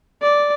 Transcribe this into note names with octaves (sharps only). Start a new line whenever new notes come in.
D5